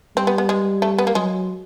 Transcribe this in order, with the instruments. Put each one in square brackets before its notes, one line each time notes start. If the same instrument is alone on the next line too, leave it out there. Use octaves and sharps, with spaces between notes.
[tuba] G3 [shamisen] C4
[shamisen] B3
B3
G#3
A3
B3
A#3
[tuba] F#3 [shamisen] G#3